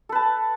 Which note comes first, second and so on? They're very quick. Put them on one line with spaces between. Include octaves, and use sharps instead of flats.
A4 B4 A5